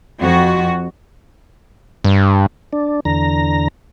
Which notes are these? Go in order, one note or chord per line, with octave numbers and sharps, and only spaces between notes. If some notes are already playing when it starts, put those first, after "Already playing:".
F2 F#4
G2
D4
E2 D3 A#5